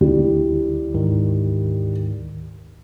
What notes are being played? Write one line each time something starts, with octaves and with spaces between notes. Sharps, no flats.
D2 G3 E4
G#2 D#3